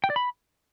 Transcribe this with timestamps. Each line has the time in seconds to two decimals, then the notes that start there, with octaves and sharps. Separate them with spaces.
0.04 G5
0.10 D5
0.16 B5